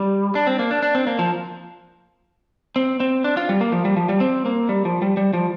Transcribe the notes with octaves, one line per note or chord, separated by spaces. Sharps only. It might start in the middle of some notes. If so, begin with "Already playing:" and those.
Already playing: G3
D4
C4
A#3
D4
D4
C4
A#3
F3
C4
C4
D4
F4
G3
A#3
F3
G3
F3
G3
C4
A#3
G3
F3
G3
G3
F3